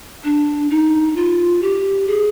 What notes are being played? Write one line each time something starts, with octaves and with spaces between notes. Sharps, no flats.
D4
D#4
F4
G4
G#4